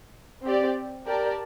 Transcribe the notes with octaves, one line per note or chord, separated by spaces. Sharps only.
C4 G4 D5
G4 A#4 D5 A5